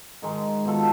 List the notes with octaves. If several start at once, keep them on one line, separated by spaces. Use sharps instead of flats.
G#2 D#3 G#3
B2 D#3 F4 A4